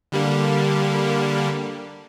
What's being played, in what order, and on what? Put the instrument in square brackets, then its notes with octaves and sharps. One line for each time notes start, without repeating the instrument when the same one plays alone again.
[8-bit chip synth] D3 G3 A#3